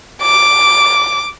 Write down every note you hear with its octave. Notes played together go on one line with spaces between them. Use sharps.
D6